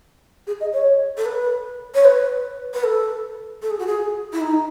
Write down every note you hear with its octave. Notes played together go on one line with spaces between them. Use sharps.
G#4
D#5
C#5
A4
B4
C#5
B4
B4
A4
A4
G#4
F#4
G#4
E4
D#4